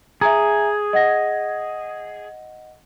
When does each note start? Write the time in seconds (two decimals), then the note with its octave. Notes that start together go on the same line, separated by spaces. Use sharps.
0.21 G#4 E5 G#5 A#5
0.93 D#5 F#5 A#6